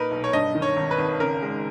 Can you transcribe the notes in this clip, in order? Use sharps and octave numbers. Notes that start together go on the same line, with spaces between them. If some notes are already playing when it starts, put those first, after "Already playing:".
Already playing: A#2 A#3 D#4 A#4 B4
B1
C#5
G2 D#5
D#3
C#5
G#1
B4
G#1
C#3 A#4
G#3